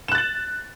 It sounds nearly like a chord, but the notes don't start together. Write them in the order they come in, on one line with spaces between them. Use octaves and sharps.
E7 F#6 A6 F#7